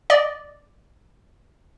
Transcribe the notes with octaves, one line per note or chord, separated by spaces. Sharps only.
D5 D#5